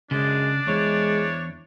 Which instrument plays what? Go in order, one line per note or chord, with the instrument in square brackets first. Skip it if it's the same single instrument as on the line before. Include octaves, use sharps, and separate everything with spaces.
[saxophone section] F#2 G#3 [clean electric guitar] C#3 [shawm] D4
[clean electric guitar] E2 [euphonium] G#3 [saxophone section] E4 C5 C#5